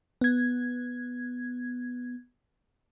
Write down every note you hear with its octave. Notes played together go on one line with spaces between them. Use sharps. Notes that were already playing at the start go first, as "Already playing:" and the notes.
B3 G#6